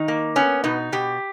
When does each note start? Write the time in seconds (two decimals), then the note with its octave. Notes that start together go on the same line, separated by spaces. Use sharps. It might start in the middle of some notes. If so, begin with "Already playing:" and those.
Already playing: D#3 D#4
0.08 A#3
0.36 B3 C#4
0.64 B2 D#4
0.92 B2 G4